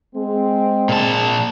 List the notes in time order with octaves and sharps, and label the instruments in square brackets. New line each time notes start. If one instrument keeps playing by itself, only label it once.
[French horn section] G#3 C4
[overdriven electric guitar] A#2 A5